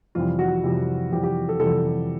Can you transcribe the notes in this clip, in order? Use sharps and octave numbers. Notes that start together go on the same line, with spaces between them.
F2 C3 E3 G3 F4
F#4
F2 C3 E3 G3
F2 C3 E3 G3 G4
G4
A4
F2 C3 E3 G3 A4